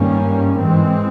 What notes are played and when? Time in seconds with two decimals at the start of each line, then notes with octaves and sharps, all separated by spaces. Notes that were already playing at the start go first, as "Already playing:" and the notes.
Already playing: G2 D#3 G3 A#3 C#4
0.58 G#2 E3 G#3 C4